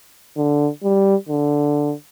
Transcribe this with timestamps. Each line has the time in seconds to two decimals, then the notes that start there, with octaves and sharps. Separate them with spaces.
0.37 D3
0.83 G3
1.29 D3